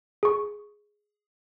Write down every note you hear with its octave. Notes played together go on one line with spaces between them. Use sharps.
G#4 C#6